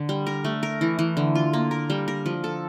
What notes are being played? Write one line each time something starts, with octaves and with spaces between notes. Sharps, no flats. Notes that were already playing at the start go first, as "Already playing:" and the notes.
Already playing: D3
G3
A#4
A3
A#4
E3
E3
D3
F4
A#3
A#4
G3
A#4
F3
A4